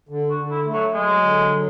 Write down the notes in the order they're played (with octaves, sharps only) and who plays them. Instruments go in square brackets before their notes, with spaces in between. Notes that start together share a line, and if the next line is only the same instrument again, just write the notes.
[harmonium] D3
[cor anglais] F#4
[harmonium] D3
[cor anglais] E4
[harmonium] A3
[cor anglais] F#3
[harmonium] F#3 [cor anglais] G#3
[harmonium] D3
F#3